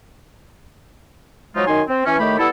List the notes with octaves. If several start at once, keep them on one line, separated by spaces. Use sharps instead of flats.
F3 F#3 G#3 D#4 F4
F#2 D#3 D#4 G#5 C6
C4
E3 C#4
A2 D#3 A3 G4 B5
G3 B3 E4 A4